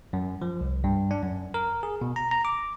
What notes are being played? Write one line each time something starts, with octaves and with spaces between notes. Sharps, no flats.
F#2
F3
C2
G2
D4
F#2
A#4
G#4
B2
A#5
A#5
D6